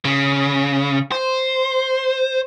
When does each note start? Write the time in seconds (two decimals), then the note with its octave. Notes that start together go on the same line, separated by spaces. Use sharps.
0.05 C#3
1.12 C5